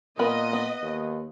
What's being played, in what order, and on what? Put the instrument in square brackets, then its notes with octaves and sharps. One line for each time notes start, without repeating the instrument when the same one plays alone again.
[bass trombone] A#2 [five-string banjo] B3 A#4 B5 [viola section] D#5
[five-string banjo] B3
[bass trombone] D#2